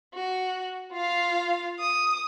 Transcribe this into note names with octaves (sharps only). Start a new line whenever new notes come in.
F#4
F4 F5
D#6